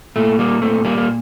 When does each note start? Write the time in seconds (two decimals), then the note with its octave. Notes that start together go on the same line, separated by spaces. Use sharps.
0.16 A#2 A3
0.39 G3 A#3
0.62 A3 C4
0.85 G3 A#3
0.98 A#3